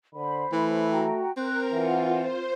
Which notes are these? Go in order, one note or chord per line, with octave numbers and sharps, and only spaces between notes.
D3 C5 B5
E3 A3
F#4 G5 A#5
C4 A#4 C5 F#6
E3 F4 F#5
C5